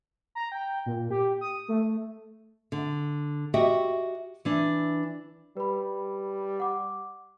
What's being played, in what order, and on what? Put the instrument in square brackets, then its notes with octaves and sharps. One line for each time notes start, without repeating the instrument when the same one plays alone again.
[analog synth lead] A#5
G5
A#2
G4
D#6
A3
[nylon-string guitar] D3
F#4 G4 D#5 E5 G5
E3 D4
[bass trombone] G3 [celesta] B4 B5
[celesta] F#5 D6